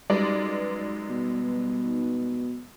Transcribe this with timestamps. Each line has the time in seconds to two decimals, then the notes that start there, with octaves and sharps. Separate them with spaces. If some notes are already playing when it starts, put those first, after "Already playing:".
0.10 F#2 G3 G#3 D#4 B4 D5
1.10 B2